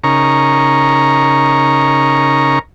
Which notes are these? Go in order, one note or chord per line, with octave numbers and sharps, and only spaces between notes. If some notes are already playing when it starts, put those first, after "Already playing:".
C#3 D#4 A#4 A#5 C#6